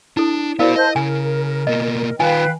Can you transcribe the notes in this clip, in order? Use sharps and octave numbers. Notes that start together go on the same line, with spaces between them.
D4 E4 A4
B3 E4 F#4 A#4 C5 D5 F5
C5 D#5 A5 G6
C#3 A#4 G#5
B2 A#3 D#5
D#3 F4 B4 F5 G5 G#5